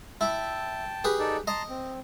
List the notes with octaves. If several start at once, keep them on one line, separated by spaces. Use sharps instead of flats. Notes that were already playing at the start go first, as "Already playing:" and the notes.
E4 G5 A5
G4 G#4 B4
D#4 A4 D5
D#5 A5 A#5 C6
C4